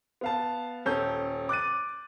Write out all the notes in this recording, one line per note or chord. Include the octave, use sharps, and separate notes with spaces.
B3 F5 A5
D#1 C#4 A4 G6
D6 F#6 A6 D#7